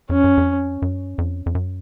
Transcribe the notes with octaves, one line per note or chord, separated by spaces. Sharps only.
F2 C#4
F#2
F2
F#2
F2
F2
F#2